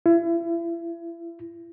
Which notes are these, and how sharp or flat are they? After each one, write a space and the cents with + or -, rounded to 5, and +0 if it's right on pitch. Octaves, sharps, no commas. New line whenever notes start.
E4 +35